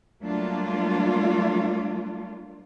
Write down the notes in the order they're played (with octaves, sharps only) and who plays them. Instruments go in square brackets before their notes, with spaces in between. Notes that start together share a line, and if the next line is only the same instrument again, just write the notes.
[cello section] F#3 G3 A3 A#3 D4 F4